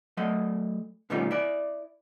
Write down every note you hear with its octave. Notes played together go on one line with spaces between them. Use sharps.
F#3 A3 D#5
B2 D#3 G3 A3 C#4 F4
E4 D5